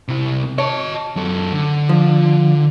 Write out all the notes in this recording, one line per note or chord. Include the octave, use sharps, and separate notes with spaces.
C3 E4
C#5 D#5 A5
F#2 A4
D3
F3